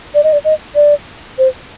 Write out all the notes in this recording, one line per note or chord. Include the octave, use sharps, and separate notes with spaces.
D5
D#5
D5
D#5
D5
C5